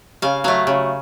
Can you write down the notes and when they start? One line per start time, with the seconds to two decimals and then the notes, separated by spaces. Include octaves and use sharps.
0.22 C#3 F5
0.44 F#3 A3 F5
0.67 C#3